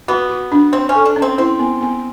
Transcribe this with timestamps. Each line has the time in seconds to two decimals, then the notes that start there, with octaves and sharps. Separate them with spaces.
0.08 B3 F#4
0.30 F#4
0.52 D4
0.73 C4 C#5
0.89 C#4
0.95 A4
1.05 D4
1.16 C#4
1.22 C4
1.38 C4 E4
1.59 B3
1.81 B3